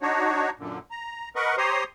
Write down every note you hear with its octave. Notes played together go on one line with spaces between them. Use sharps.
D4 D#4 F#4 C#5
F#2 A#2 D3
A#5
A#4 B4 D#5 F#5 C#6
G4 C5 C#5 A#5 C6 D#6